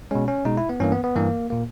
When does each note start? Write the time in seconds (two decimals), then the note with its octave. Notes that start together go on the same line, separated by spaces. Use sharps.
0.11 B2 G#3 C#4
0.28 C#4
0.45 B2 G#3 D#4
0.57 E4
0.69 B3
0.80 G2 E3 A#3 C#4
0.92 B3
1.04 B3
1.16 G2 E3 A#3
1.50 A#2 A#3